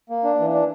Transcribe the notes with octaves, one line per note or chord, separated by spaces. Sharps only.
A#3
D4
E3
D4